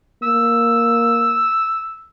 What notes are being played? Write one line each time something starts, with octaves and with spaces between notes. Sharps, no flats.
A#3 E6